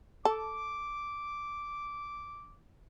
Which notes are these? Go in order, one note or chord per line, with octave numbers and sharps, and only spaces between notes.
A4 D6